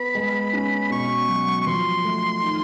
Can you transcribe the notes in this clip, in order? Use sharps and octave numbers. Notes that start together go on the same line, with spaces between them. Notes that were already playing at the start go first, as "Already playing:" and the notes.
Already playing: B3 B5
G#3
C#4
B2 C#6
F#3
C#6
F3 C6
A3
D#3